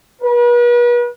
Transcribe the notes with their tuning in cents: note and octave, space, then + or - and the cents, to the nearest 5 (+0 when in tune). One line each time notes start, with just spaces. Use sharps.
B4 -40